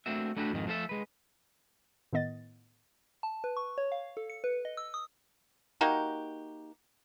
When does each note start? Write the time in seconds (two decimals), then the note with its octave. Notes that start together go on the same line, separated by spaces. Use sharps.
0.06 A3 A#3 C4 D4 F#4 E5
0.36 A3 D4 E4 F#4 G4
0.52 F2 G#2 D#3
0.67 F3 A3 F4 A4 E5
0.89 G#3 B4
2.13 A2 D#3 B3 D#5 A6
3.23 A5
3.44 B4
3.57 C#6
3.78 C#5
3.92 F5
4.17 A4
4.30 C#7
4.44 B4
4.65 D#5
4.77 E6
4.94 D#6
5.81 A#3 D#4 F#4 G4